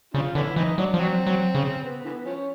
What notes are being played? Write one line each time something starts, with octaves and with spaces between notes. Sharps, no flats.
C#3 C4 D4 F4
D3 B3 C#4 E4
E3 C4 D#4
F#3 D4
F3
F#3 C4
F#3
C#3
B3
D3 E3 B3
F3 C#4